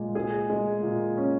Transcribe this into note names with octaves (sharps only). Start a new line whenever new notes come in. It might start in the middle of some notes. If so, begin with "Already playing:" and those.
Already playing: A#2 G#3
G#4
G#3
A#2
C#4